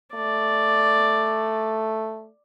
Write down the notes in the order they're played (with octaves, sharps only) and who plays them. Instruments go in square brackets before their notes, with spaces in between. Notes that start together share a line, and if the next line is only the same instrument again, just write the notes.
[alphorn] A3 [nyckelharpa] D5